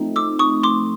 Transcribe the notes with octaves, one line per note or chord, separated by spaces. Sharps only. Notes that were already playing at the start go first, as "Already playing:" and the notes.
Already playing: F3 A3 C4 D#4
D6 E6
C#6 D#6
C6 D6